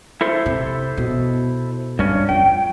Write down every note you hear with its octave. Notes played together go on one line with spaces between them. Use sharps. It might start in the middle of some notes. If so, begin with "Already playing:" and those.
E4 A4 C5
C3
B2
G2 D3 C#4
F2 G5